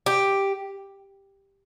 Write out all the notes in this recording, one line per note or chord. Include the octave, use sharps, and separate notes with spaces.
G4